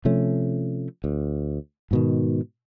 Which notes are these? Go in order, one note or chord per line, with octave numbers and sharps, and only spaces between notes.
C3 F3 A3 C#4
D2
G#2 B2 D#3